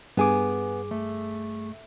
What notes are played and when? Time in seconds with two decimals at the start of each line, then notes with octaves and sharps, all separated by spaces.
0.17 G2 B3 G#4 G#5 D6
0.91 A3